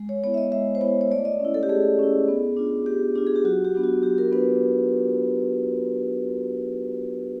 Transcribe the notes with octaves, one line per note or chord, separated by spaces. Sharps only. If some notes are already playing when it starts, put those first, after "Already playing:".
Already playing: G#3
C#5
B3 E4 C#5
E5
D#5
G#3 E5
C5
B3 E4 C#5
C#5
A3 D5
D#5
C#4
E4
A4
G4
A3 G#4
C#4 E4
B3
D4 F4
B3 G4
D4 F4 G4
G#4
G4
F#3 F#4
G4
B3 D4 F4
F#4
F#3 G4
A#4
B3 D4 F4 B4